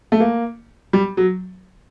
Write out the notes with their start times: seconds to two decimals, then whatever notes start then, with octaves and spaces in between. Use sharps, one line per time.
0.12 A3
0.20 A#3
0.93 G3
1.17 F#3